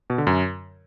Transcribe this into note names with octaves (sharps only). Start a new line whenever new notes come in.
B2
D3
F#2